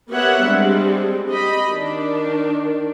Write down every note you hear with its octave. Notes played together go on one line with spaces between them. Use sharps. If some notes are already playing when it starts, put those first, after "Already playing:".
B3 G4 A#4 C#5 E5 F#5
G3 G#3 C4 D4
G4 D#5 B5
D#3 D4